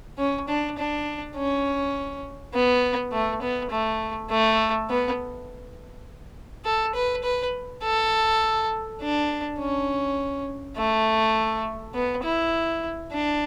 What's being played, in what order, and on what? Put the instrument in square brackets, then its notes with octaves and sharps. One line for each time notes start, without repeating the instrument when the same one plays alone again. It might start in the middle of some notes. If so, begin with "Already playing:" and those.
[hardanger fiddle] C#4
D4
D4
C#4
B3
A3
B3
A3
A3
B3
A4
B4
B4
A4
D4
C#4
A3
B3
E4
D4